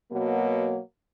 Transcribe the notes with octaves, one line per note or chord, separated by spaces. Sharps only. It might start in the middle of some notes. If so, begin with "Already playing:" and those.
B2 F#3 A#3